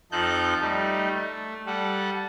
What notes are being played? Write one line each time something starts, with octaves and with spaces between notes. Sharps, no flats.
F2 F3 D#4 A4 F#6 G6
G3 A3 D#4
A3
G3 A4 F#5